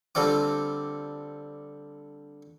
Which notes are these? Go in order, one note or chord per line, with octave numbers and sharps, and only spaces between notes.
D3 G3 C4 F4 D6